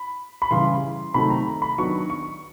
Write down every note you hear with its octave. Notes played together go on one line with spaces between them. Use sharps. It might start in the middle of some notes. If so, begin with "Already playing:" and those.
Already playing: B5
B5
C#3 E3 G3 C6
C3 D#3 F#3 A3 B5
A#5
B5
D#3 F#3 B3 D4 C#6
C#6